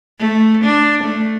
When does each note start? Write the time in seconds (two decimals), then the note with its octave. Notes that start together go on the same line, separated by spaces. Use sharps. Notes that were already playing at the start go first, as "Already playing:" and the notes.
0.19 A3
0.65 D4
1.04 A3